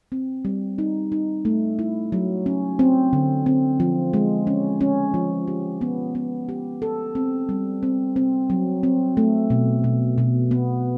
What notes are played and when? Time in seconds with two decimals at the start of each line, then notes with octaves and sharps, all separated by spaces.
0.12 C4
0.45 G3
0.78 D#4
1.12 D#4
1.45 A3
1.79 E4
2.12 F#3
2.46 C#4
2.79 C4
3.13 D3
3.46 C4
3.80 F3
4.13 G#3
4.47 C#4
4.81 C#4
5.14 F3
5.48 G4
5.81 B3
6.15 B3
6.49 G4
6.82 A4
7.15 C4
7.49 G3
7.83 C4
8.16 C4
8.50 F#3
8.83 C4
9.17 A3
9.50 B2
9.84 B2
10.18 B2
10.51 B3